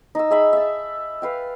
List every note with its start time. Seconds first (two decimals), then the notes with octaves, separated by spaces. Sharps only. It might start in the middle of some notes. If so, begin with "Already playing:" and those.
0.15 D#4 E6
0.31 G#4 E5 B5
0.53 E5 A5
1.22 B4 F5 G5